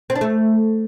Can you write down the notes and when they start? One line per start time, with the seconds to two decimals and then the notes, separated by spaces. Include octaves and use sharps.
0.10 C4
0.15 D4
0.21 A3